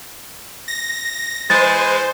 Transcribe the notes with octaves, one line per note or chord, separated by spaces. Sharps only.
A#6
E3 G#3 C5 A6